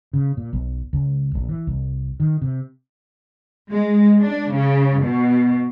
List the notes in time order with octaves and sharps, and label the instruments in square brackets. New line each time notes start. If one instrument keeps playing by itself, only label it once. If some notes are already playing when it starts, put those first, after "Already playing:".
[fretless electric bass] C#3
A#2
B1
C#2
A#1
E3
C2
D#3
C3
[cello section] G#3
D4
C#3
B2